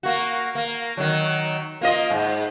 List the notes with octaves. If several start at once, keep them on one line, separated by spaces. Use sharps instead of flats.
A#3 F#4
A#3
D#3 F#3
A#3 F4 D#5
G#2